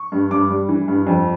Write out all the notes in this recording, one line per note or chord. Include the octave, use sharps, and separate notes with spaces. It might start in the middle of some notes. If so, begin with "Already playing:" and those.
Already playing: C#6
G2
G2 D6
G3
E3
G2
F2